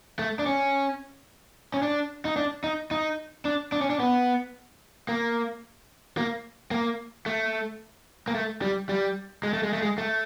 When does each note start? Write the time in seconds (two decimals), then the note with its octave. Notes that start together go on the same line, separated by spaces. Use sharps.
0.19 A3
0.39 D4
0.46 C#4
1.74 C#4
1.82 D4
2.25 D#4
2.36 D4
2.64 D#4
2.91 D#4
3.45 D4
3.72 D4
3.81 C#4
3.90 D4
4.00 B3
5.09 A#3
6.17 A#3
6.71 A#3
7.26 A3
8.28 A#3
8.35 A3
8.62 G3
8.89 G3
9.43 G#3
9.53 A3
9.63 G#3
9.73 A3
9.82 G#3
9.98 A3